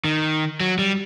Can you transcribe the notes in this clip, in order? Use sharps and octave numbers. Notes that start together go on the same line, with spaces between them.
D#3
F#3
G3